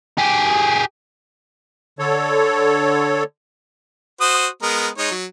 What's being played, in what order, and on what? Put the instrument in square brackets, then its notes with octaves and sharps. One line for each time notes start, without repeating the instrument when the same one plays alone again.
[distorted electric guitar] G4 G#4
[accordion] D3 A4 C#5
[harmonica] F#4 C5 D#6
G#3 B3 A#4
G#3 D#4 C#5
F#3